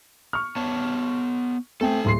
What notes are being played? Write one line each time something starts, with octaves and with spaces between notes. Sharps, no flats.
C#6 F6
B3 C#5 A5
A3 C4 A4 G5 G#5
D1 C6 C7